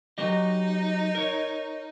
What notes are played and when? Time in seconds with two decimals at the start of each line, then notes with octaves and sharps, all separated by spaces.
0.18 F#3 D#4 G4 D#5
1.15 A#4 C#5